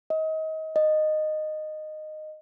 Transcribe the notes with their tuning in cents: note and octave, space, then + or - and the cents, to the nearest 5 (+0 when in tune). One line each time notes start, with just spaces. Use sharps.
D#5 +30
D#5 -10